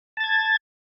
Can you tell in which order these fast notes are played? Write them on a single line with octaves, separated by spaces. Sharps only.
A5 A6 G#6